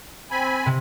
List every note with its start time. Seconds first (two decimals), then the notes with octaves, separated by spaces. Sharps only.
0.31 C4 G#5 B5
0.66 C3